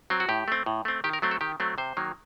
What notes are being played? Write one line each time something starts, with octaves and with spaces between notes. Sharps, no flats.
F#3 C4
F#4
A2 G4
A3 C4
A2
A3 C4
D#3 G4
A#4
F#3 A3 C4
A4
D#3 G4
F#3 A3 C4
C3 C5
D#3 F#3 A#3